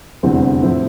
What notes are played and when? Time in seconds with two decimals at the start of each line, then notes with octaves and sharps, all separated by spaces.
0.23 F1 E2 D3 G3 C4
0.63 A2 F3 C4 E4